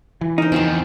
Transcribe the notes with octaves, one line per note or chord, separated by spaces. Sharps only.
E3
D#4 A#4 C5
E2 F3 C4 F4 A5